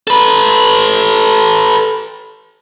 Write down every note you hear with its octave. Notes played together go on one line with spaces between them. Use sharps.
A4 B4